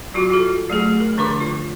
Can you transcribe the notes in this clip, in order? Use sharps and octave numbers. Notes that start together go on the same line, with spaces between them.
F#3 F4 F#4
F4 F#4 A4
F#3 A3 G#4
A#4
D3 F3 D4 B4 C6 D6
F4